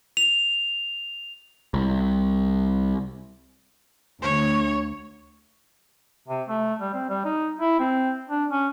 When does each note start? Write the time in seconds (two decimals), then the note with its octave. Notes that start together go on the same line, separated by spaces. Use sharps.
0.17 F7
1.74 C2
4.22 D2 C#5
6.28 C3
6.48 A3
6.80 G3
6.94 C4
7.09 G3
7.25 D#4
7.60 E4
7.79 C4
8.29 D4
8.50 C#4